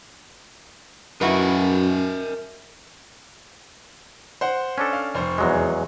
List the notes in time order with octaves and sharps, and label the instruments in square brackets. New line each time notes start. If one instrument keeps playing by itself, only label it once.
[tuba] F#2 [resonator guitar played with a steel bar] E4 F#4 B4 [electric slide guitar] A#4 D#5 E5
[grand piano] C5 F#5
[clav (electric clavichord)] C#4 D4 A4
[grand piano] F5
F1 C5 C#6
[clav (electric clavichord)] E2 F#3 G#3